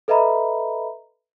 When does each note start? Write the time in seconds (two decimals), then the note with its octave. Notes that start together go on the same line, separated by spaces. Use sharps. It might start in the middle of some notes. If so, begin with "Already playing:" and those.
0.08 A4 B4 D#5 E5 A#5 B5